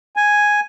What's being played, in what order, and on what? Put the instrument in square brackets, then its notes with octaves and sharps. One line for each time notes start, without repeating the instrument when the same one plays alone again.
[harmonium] G#5